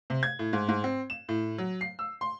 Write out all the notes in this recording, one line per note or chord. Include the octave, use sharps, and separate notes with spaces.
C3
G#6
A2
G#2
G#2
C4
E7
A2
F#3
C7
E6
C6